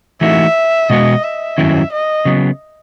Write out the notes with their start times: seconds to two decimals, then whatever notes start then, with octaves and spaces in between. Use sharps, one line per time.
0.21 E3 A3 D#4 F#4 E5
0.90 B2 G#3 B3 F#4 D#5
1.24 E5
1.58 F#2 D#3 F#3 C#4 E4
1.92 D#5
2.25 C#3 F#3 B3